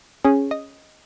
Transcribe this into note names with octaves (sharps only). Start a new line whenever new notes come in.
C#4 G#4
D#5